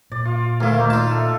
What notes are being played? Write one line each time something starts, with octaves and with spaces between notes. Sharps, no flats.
A#2 D5
F4
D2 D#3 A#3 E4 F5
A#3 D#4
D4 F4 A5
A4 E5